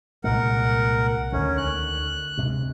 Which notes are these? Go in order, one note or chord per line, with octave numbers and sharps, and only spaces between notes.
C2 A#2 G#3 A#4 F#5
D2 D3 D#3 C#4
F#6
D2 C3 G#3